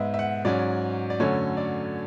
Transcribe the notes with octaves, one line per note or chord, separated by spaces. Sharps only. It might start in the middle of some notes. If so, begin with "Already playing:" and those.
Already playing: G#2 G#3 B3 E5
E5
F#5
G#2 F#3 C#4 D5
D5
F#2 D3 F#3 A3 C#4 C#5
D5